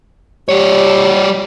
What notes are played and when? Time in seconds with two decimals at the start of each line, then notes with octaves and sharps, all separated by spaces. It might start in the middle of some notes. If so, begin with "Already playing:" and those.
0.49 G3 G4 C#5